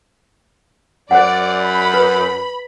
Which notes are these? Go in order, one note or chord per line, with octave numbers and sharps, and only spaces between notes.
F#2 C5 D5 F#5
B5
B4